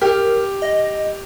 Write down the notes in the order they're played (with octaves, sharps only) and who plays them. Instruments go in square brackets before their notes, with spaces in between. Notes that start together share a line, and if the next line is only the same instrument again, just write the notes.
[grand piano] G4 [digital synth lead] A#4
[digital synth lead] D#5